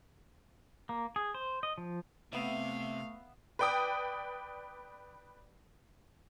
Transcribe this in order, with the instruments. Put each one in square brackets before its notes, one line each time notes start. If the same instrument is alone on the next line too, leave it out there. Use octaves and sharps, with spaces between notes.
[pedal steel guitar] A#3
G#4
C5
D#5
F3
[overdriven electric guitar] C3 [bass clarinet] A3 [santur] B3 E5 [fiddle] F5
[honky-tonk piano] B4 D5 G5 D6 D#6